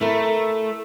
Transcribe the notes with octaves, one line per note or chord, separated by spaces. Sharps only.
A3 E4 A#4